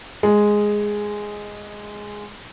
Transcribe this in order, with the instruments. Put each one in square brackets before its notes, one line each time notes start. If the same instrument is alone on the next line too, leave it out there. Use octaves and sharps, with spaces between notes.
[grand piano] G#3